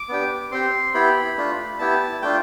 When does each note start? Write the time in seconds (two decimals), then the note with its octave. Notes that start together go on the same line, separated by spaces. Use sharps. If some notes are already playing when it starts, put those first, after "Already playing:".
Already playing: D6
0.09 B3 D4 G4
0.51 C4 G4 C6
0.94 B3 E4 G4 B5
1.37 A3 D4 F4
1.79 B3 E4 G4 A5
2.22 A3 D4 F4 G5